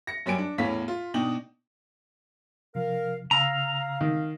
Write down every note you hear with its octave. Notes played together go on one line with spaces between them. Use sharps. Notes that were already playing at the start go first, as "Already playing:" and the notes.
A#6 C#7
F#2 F#3 G3 G#5 D7
D4
E2 A2 E3 C#4 F5 B6
F4
B2 D4 D#4 G5 F#7
C3 F3 A#4 F5
C#3 F5 A#5 E6 F6
D#3